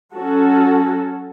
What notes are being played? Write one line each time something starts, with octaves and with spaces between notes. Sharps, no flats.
F#3 C#4 F#4 A4